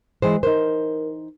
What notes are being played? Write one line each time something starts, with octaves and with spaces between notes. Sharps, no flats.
E3 G#3 C5
D#4 A#4 C5